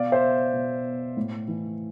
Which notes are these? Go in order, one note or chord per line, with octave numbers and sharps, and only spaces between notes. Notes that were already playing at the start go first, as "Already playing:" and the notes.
Already playing: B2 D5 F5
C5 E5
B2
A2
E3